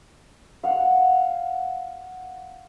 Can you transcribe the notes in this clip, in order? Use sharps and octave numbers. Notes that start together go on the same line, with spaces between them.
F5 F#5